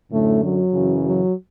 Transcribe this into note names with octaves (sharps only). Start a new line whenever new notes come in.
F#2 A2 D3 A3
F#3
F#2 C#3 E3
F#3